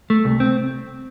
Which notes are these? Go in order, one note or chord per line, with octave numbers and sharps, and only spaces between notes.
A3
C2
C4